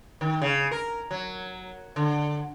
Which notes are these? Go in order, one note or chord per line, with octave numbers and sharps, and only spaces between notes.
D#3
C#3
A#4
F#3
D3